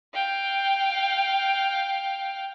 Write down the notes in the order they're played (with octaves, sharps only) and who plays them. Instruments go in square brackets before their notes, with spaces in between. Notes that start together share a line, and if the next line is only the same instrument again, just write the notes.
[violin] F5 G5